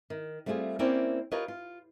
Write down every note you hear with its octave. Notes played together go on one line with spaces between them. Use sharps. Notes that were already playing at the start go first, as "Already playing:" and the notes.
D#3
G3 A3 C4 F4 G4 G#4
A#3 C4 C#4 E4 D5 G5
F4 G4 A#4 B4 C#5 D#5
F4